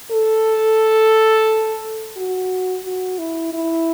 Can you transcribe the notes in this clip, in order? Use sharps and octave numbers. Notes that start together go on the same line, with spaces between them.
A4
F#4
F#4
E4
E4